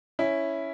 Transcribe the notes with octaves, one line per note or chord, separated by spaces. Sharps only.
C#4 E4